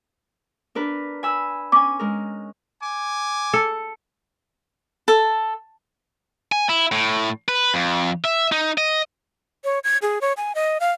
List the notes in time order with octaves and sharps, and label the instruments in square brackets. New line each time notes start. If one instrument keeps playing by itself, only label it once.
[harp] D4 A#4 B4
G#5 B5 E6
[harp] C#4 G#5 [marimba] D6
[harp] G#3 A#4
[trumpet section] G#5 D6
[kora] A4
[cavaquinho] A4
[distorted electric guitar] G#5
E4
A2
B4
F2
E5
D#4
D#5
[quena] C#5
G#6
G#4
C#5
G#5
D#5
F5